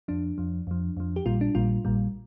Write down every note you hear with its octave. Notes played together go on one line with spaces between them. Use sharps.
F2 F3 D4
F2 F3
F2 F3
F2 F3
G4
A#1 A#2 G3 F4
D4
A#1 A#2 G3 F4
A#1 A#2 G3